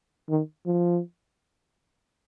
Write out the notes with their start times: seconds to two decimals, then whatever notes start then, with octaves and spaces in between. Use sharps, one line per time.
0.29 D#3
0.66 F3